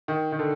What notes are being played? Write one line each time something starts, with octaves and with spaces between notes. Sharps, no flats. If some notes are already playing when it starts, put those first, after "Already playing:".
D#3
D#3
D3